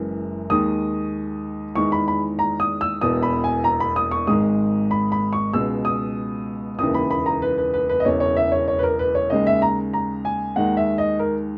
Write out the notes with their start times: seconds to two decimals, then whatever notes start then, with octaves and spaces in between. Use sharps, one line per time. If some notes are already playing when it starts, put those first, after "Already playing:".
Already playing: F#1 F#2 E3 G#3
0.50 D#2 D#3 G#3 D#6
1.75 E2 D#3 G#3 C#6
1.92 B5
2.08 B5
2.39 A#5
2.60 D#6
2.81 E6
3.01 E1 E2 B2 D#6
3.23 B5
3.44 G#5
3.64 A#5
3.80 B5
3.96 D#6
4.11 C#6
4.27 G#1 G#2 D#3 G#3 D#6
4.91 B5
5.12 B5
5.33 C#6
5.53 C#2 B2 G#3 E6
5.85 D#6
6.79 E1 D#2 C#3 E3 D#6
6.94 B5
7.11 B5
7.26 A#5
7.42 B4
7.58 B4
7.74 B4
7.89 B4
8.00 D#5
8.05 E1 E2 C#3 C#5
8.20 C#5
8.37 E5
8.52 C#5
8.68 C#5
8.79 B4
8.83 A#4
8.99 B4
9.15 C#5
9.30 D#2 C#3 G#3 D#5
9.47 E5
9.62 A#5
9.93 A#5
10.25 G#5
10.56 D#2 D#3 G#3 F#5
10.77 E5
10.98 D#5
11.19 A#4